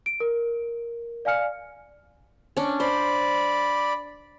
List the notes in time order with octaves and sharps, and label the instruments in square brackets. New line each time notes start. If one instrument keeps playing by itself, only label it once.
[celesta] D7
A#4
D5 F5 G#5 F6 C#7
[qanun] C#4 D4
[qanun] C5 [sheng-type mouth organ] D5 B5